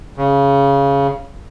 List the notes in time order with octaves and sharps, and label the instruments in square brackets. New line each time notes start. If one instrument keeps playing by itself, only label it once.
[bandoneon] C#3